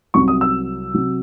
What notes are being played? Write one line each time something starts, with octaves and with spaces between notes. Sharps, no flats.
C2 C3 F#3 C#6
D#6
E6
C3 F#3